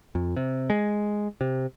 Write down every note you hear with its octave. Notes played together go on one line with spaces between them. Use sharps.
F2
C3
G#3
C3